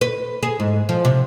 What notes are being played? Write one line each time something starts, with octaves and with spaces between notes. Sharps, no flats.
B4
G#4
G#2
F3
C3